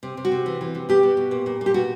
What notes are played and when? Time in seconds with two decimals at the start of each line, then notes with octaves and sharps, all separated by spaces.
0.03 C3
0.17 C3
0.25 F#4
0.32 C3
0.46 E3
0.61 E3
0.75 C3
0.89 B2 G4
1.03 B2
1.17 B2
1.31 A#2
1.46 A#2
1.61 A#2
1.66 G4
1.74 B2 F#4